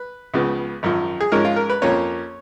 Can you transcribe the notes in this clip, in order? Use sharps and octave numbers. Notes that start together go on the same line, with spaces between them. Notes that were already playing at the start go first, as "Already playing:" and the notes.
Already playing: B4
C#2 C#3 F3 B3
G#1 F#2 F3
G#4
G#2 F3 G#3 C#4 A#4
F4
A#4
B4
F2 F3 A#3 C#4 C#5